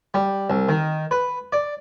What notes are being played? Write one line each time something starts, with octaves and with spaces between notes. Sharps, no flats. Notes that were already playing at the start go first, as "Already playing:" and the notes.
G3
C2
D#3
B4
D5